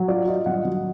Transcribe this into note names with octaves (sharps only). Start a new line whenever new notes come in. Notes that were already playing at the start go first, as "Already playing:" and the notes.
Already playing: F#3
F4 D5 F5
F4 D#5
F#3 D#5 F#5
F#3